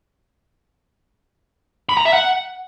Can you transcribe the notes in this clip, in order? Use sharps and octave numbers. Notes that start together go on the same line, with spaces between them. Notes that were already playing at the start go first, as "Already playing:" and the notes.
B5
A#5
E5
F#5